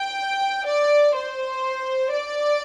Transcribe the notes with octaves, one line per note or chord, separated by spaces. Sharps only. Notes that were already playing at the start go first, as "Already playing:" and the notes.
Already playing: G5
D5
C5
D5